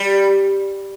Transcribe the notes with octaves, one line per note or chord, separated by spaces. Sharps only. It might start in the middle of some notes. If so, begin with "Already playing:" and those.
Already playing: G3